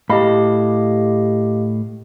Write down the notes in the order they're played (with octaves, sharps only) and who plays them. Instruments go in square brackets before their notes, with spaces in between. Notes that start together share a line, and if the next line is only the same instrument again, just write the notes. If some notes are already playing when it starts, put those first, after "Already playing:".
[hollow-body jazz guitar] A2 B5 [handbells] G4 D#5 F5